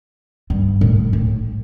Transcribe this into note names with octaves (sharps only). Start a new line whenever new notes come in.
G2
A2
A2